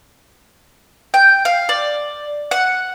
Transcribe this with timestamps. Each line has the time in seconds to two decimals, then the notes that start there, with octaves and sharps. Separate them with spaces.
1.14 G5
1.45 F5
1.69 D5
2.51 F#5